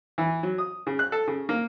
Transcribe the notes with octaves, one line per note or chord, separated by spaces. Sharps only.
E3
F#3
D#6
C#3
F#6
A4
C#3
A#3